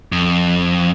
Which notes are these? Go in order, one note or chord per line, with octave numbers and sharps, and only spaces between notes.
F2